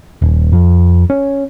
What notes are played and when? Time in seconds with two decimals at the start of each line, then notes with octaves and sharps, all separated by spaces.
0.22 D#1
0.52 F2
1.10 C#4